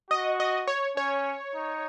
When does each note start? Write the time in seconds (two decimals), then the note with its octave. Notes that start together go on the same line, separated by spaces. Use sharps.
0.10 F#4 D#5
0.40 D#5
0.68 C#5
0.96 C#4 C#5
1.55 D#4